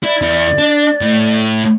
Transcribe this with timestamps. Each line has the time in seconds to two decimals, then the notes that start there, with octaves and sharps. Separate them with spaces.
0.03 E4 D5
0.22 E2 E4
0.58 D4
1.02 A2